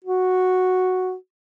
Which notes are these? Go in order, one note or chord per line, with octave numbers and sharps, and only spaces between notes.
F#4